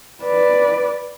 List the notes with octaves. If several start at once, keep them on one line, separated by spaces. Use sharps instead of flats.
B4 D5